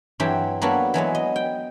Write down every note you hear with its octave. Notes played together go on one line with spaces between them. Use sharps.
G2 E3 F#3 C4 G4
F#3 A#3 B3 D4 F#4 A4
E3 F#3 G#3 B3
D#5
G5